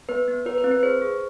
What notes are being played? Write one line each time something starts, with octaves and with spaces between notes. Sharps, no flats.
B3 B4
B3
F4 B4
B4
C4
B4
G#4 C5
G#4